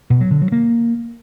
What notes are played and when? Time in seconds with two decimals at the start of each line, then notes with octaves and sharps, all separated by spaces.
0.10 B2
0.21 F#3
0.31 D3
0.42 F#3
0.52 A#3